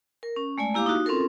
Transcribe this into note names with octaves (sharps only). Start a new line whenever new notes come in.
A#4
C#4
G#3 A3 D5 G#5
A#3 E4 G4 F5 D6
D#4 F#4
C4 C#4 F4 A4 A#4